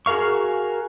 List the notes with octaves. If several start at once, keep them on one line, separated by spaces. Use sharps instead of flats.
F#4 G#4 A#4 F5 C#6